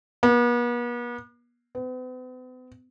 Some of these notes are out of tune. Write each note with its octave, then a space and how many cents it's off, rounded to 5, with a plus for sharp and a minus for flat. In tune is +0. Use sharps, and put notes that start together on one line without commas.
B3 -45
B3 +45